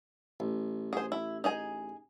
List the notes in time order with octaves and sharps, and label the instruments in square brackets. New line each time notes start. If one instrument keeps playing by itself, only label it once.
[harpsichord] A1
[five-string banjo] G#4 C5
E4
D#4 G#4 G#5